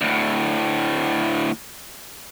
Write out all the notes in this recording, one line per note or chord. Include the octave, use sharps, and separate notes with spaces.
D2 A2